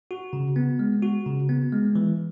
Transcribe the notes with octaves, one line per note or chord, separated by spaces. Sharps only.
F#4
C#3
B3
G#3
F#4
C#3
B3
G#3
E3